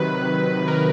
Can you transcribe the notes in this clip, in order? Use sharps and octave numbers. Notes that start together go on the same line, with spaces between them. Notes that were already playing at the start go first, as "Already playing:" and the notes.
Already playing: C3 D#3 F#3 B4
A#4